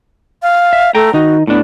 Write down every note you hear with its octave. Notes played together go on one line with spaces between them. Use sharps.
F5
E5
A3 G5 A#5
D#3 D#4 F#4
A2 B3 D4